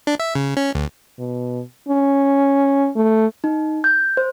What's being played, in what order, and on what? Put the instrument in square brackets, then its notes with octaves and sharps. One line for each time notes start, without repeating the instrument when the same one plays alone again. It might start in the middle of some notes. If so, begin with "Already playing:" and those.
[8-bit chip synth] D4
E5
C#3
C#4
D2
[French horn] B2
C#4
A3
[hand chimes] D#4
G6
C5